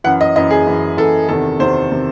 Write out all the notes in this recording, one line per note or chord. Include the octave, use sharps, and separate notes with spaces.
F#2 E3 F#5
D#5
F#2 E3 D#5
G#4
F#2 E3
F#2 E3 A4
E2 C3 D#3 A4
E2 C3 D#3 C5
C3 D#3